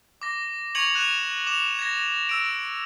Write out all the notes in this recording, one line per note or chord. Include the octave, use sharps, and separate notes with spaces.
D6 A#6
C#6 G#6 C#7 F7 F#7
F#6 E7 F7
D6 E7 F7
G#6 A#6
E6 D7